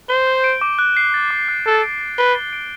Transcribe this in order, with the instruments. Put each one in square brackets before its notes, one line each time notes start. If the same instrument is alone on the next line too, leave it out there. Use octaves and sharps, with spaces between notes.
[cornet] C5 [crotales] G7
[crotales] G6
D7
D6
F#6
C7
A6
D6
F#6
[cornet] A4 [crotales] A6
[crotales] D7
A6
[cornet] B4 [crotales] G7
[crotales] A6
D7